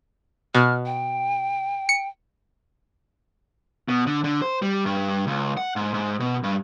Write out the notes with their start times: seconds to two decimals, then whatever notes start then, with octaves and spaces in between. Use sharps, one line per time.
0.55 B2 F6
0.86 G5
1.89 C#7
3.89 B2
4.07 D3
4.24 D3
4.42 C5
4.62 G3
4.86 G2
5.27 C#2
5.57 F#5
5.76 G#2
5.94 G#2
6.20 B2
6.43 G2